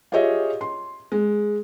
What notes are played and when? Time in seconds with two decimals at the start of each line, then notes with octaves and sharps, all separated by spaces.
0.12 F4 G4 G#4 C#5 D#5 E5
0.61 C6
1.12 G#3